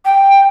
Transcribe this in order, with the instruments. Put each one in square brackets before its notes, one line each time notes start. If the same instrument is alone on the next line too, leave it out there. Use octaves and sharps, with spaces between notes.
[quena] G5